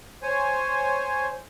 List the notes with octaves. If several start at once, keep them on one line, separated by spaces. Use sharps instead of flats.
C5 C#5 G#5